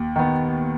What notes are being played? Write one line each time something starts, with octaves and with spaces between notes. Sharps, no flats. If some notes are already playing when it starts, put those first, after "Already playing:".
Already playing: D#2
D#3 B3